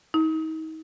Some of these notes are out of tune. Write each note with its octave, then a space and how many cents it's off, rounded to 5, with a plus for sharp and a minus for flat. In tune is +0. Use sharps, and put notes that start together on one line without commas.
D#4 +35